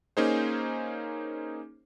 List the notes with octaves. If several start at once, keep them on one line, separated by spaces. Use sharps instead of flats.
A#3 C#4 D#4 G#4 C5